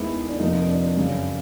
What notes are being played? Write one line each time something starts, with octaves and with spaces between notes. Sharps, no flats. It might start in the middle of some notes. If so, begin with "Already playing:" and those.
Already playing: D#2 D#3 G#3 B3 E4
D4
F1 F2 C3 F3 A#3 D#4
D4
F#2 C#3 F#3